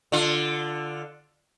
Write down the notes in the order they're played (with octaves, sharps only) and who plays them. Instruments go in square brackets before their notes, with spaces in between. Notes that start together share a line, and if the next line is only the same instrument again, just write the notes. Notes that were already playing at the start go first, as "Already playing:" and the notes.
[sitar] D3 F4